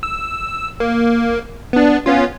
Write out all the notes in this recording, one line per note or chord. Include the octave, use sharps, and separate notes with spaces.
E6
A#3
B3 D4
B3 C#4 F4